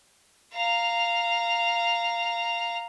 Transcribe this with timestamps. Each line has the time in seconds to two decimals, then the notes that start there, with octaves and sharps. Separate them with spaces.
0.54 F5 A#5